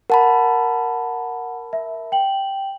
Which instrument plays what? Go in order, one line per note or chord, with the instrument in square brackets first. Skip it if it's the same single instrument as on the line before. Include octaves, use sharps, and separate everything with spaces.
[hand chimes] A#4 A5 B5 [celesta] F#5
[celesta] E5
G5 F#7